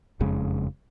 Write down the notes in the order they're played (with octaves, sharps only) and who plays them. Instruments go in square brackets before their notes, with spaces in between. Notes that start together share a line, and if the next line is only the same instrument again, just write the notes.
[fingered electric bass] F#1 F2 C#3 G#3